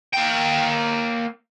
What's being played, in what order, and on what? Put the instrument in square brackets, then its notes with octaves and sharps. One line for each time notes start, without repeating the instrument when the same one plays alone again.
[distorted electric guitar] A#3 G5